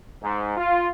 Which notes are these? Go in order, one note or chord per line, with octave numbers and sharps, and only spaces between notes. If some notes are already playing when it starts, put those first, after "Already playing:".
G#2
F4